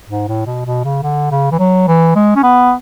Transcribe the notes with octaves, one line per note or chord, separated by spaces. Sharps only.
G#2
A2
B2
B2
C#3
D3
C#3
E3
F#3
E3
G#3
C#4
B3